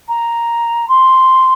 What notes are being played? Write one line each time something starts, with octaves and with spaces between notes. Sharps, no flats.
A#5
C6